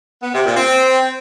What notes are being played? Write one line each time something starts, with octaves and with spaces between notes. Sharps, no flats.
B3
C3
A#2
C4